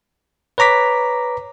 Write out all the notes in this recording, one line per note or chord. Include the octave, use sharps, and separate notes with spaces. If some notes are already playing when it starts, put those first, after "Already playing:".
B4 C#5 A#5 D6 B6